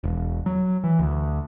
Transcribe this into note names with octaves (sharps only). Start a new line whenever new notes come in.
E1
F#3
E3
D2